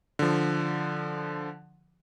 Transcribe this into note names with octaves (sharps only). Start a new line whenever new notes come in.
D3 F3